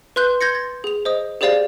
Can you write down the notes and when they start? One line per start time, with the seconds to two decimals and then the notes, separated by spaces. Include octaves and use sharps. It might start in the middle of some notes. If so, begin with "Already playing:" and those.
0.16 B4 C6 F#6 G6
0.41 C6 G6 G#6 A#6 C#7
0.55 A6
0.84 G#4 F7
1.05 C5 D#5 D#6
1.41 G4 G#4 C5 D5 F5 A6